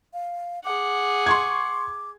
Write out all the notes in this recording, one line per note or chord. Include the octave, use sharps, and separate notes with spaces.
F5
G#4 F#5 D6
C6 C#6 G#6